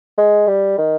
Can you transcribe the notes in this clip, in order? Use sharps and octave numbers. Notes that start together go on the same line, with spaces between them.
G#3
G3
D#3